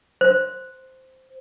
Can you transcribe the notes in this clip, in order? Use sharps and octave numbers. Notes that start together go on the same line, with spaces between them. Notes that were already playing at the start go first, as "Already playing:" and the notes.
C5